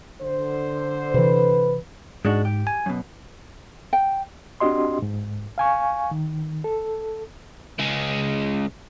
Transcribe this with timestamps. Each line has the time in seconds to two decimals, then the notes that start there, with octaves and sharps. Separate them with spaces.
0.20 D3 C5
1.14 C3 E3 B4
2.25 G#2 G#3 D4 F#4
2.45 G4
2.67 G#5
2.86 F#2 B2
3.93 G5
4.60 C4 D4 F#4 G4 D#5 C6
5.02 G#2
5.58 F5 G#5 C#6
6.11 D#3
6.64 A4
7.79 C#3 G#3